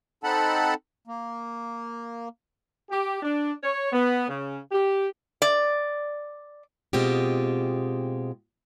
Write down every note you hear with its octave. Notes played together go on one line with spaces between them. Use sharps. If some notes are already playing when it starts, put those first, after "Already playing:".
C4 D#4 A4 F#5 A5 B5
A#3
G4
D4
C#5
B3
C#3
G4
D5
B2 G#3 C4 F4 G4